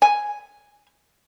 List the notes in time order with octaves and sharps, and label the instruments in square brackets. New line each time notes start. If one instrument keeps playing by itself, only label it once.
[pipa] G#5